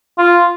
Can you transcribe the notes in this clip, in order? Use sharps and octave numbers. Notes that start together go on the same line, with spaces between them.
F4